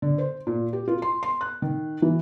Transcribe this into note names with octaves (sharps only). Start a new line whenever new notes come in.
D3
C5
A#2
G4
F4
C6
C6
F#6
D#3
E3